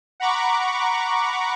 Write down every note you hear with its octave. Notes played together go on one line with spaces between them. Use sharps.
F#5 A#5 B5 C#6 D6